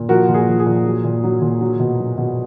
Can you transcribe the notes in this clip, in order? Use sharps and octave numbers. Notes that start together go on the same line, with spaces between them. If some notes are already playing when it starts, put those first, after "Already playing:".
Already playing: A#2
F3 F#4 A#4
A#2
G#4
F3
G#4
A#2
F#3
A#2
F#3
A#2
F#3
B2
F#3
B2